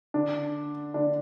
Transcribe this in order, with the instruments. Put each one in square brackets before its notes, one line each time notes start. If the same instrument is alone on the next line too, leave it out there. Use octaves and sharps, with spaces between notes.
[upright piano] D3 D4
D3 D4